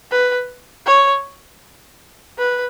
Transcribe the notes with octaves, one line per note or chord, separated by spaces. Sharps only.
B4
C#5
B4